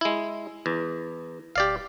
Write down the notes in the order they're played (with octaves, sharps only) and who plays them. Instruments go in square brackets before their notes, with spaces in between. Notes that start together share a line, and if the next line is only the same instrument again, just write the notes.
[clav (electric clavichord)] G#3 E4
E2
[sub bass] D1 [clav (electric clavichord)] G4 D5 F5